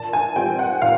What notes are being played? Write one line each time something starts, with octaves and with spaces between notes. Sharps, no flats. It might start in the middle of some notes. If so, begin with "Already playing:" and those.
Already playing: A#2 A5
G#5
G3 C4 F4 G5
F#5
A#2 F5